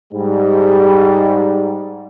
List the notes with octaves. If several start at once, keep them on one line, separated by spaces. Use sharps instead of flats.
G#2 G3